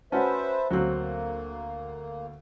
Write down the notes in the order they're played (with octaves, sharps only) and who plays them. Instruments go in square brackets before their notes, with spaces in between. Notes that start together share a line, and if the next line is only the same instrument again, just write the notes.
[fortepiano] C#4 F#4 [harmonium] B4 C5 E5 [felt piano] F#5 A5
[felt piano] D2 F#6 [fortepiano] F#3 C4 [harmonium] A#3